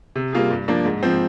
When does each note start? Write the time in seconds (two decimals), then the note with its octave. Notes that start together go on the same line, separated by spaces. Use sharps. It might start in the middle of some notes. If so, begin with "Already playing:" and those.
0.16 C3
0.33 G3 A#3 F4 G#4
0.50 G2
0.68 F3 A#3 D4
0.85 G#2
1.03 F3 C4